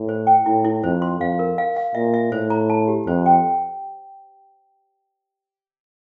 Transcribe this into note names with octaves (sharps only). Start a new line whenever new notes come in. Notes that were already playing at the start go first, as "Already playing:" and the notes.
Already playing: A2
C5
G5
A2 E4
E4
F2 C5
C6
F2 F5
A#4
F5
F5
A#2 E5
E5
A2 C5
A#5
A5
G4
F2 C5
G5